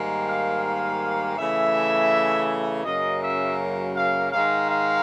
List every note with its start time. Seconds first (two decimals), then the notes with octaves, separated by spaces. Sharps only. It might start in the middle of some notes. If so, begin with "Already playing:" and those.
Already playing: G#2 D#3 G3 A#3
0.27 F5
0.64 F5
1.37 C#3 E3 A3 E5
2.85 F#2 C#3 F#3 A#3 D#5
3.22 E5
3.96 F5
4.32 G#2 D#3 G#3 F5
4.69 F5